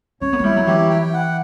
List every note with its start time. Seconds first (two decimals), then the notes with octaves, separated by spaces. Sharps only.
0.21 C#4 C#5
0.33 B3
0.39 A#3
0.44 G3 E4
0.56 F#3
0.67 E3 G4
0.90 G5
1.14 F#5